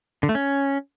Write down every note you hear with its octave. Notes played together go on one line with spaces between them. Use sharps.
D3
A3
C#4